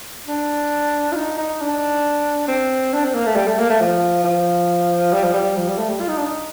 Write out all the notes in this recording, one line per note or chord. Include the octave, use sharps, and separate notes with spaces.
D4
F4
D#4
D#4
D4
C4
D4
C4
A#3
A3
G3
A3
A#3
A3
F3
F3
G3
F3
G3
F3
G3
A3
G3
F4
D#4
D4
D#4